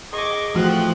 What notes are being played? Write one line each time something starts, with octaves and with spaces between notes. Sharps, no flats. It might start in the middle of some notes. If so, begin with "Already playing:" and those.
G#4 D#5 C#6 D6
E3 F3 A3 C4 F#4 F#6